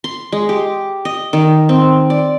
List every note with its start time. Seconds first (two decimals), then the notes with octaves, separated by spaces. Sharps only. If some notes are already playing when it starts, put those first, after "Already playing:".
0.04 C6
0.32 G#3
0.49 G4
1.05 D#5
1.33 D#3
1.69 C4
2.10 D5